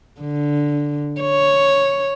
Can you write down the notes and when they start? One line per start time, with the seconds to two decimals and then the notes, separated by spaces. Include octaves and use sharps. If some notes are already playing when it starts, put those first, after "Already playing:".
0.21 D3
1.21 C#5